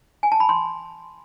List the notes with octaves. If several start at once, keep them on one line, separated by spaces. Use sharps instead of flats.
G#5
A5
B5
C6